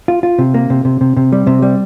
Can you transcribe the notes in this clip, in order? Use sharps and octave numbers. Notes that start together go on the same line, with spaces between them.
F4
F4
C3
A#3
C3
C3
C3
C3
G3
C3
G3